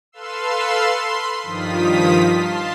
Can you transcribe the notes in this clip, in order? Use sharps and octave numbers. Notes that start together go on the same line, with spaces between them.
A4 B4 F5 C6 E6
B5 C6
G2 D#3 F3 F4 D#6 B6
F5 A5 C6